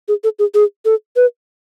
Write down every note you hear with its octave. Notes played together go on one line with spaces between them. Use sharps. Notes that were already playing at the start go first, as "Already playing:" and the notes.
G#4
A4
G#4
G#4
A4
B4